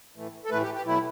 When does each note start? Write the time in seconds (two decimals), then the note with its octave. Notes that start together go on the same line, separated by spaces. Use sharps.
0.16 A2 E3 A3
0.44 A4
0.50 A2 E3 A3 B4
0.62 G4
0.74 G4
0.85 B2 F#3 A3 E4